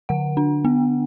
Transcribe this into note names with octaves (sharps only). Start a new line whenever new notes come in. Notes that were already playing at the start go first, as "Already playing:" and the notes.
D3 F#5
D4
B3